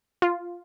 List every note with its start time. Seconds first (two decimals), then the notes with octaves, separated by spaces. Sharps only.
0.22 F4